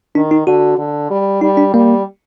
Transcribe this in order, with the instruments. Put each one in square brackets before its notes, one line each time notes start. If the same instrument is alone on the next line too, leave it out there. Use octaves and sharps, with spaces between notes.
[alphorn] D#3 [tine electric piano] D4
[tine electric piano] D#4
[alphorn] D3 [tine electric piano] F#4
[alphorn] D3
G3
[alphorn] G3 [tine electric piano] D#4
[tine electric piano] D4
[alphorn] G3 [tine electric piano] A#3